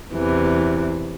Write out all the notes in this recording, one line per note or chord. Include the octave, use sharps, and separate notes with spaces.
E2 C3 E3